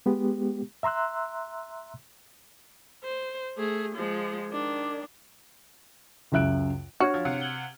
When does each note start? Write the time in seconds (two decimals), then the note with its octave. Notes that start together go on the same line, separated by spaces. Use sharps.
0.06 G#3 B3 G4
0.83 E5 A#5 C6 E6 F#6
3.04 C5
3.57 A3 G#4
3.95 F3 G#3
4.52 D#3 D4
6.32 C#2 F#2 E5 F#6 D7
7.00 D4 F#4 C#5 F6 G#6
7.14 F3
7.25 C3 F5 F#5
7.41 G#6 F#7 G7